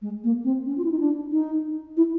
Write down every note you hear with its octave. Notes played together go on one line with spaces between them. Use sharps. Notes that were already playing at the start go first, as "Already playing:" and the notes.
G#3
A#3
C4
C#4
F4
E4
D#4
D4
D#4
E4